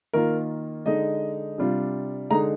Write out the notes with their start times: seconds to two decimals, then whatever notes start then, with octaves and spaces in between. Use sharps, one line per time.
0.13 D#3 A#3 F4 A#4
0.86 D3 G#3 D#4 D#5
1.58 C3 G3 D4 F4
2.31 D3 G#3 D#4 A#5